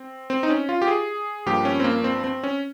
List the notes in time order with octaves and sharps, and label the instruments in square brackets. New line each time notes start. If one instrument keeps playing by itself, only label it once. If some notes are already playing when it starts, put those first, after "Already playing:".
Already playing: [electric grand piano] C4
C4
D#4
C#4
F4
G4
G#4
G2 F3 A#3 G4
C#4
C4
A#3
C4
C4
C#4